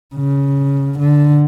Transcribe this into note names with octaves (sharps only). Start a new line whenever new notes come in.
C#3
D3